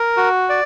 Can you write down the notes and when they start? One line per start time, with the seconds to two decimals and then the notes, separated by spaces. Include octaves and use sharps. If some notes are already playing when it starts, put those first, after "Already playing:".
Already playing: A#4
0.17 F#4
0.49 D5